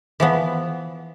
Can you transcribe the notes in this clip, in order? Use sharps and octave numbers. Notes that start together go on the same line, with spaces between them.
E3 F3 B3